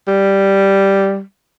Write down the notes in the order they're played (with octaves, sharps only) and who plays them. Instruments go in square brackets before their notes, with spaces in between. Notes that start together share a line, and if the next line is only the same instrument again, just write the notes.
[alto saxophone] G3